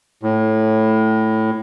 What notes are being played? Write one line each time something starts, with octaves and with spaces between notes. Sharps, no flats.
A2